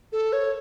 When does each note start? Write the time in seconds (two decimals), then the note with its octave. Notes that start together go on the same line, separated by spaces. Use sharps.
0.12 A4
0.33 C#5